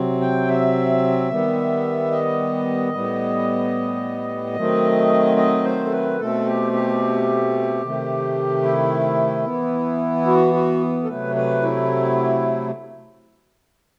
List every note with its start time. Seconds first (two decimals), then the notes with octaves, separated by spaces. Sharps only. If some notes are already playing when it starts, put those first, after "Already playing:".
Already playing: C3 F#3 C4
0.21 G5
0.49 E5
1.30 D#3 G3 B3
2.11 D#5
2.93 A2 G3 B3
4.56 D#3 F#3 A3 C4
5.37 D#5
5.64 C5
5.86 A4
5.92 B4
6.18 B2 A3 C4 A4
6.46 G4
6.73 G4
7.82 C3 D#3 A3
8.63 E4
9.44 E3 B3
10.26 F#4
10.54 F#4
11.04 A4
11.07 C3 F#3 A3 B4
11.36 B4
11.62 E4